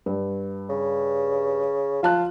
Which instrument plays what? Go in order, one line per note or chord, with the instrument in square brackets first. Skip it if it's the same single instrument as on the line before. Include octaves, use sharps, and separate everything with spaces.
[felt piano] G2
[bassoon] C#3
[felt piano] F3 A5 F#6 [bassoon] F4